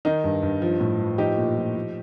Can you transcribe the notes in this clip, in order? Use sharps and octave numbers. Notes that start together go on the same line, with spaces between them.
D#3 D#4
G2
G2
F3
A2
F3
F3 D#4 G4
A#2
F3
F3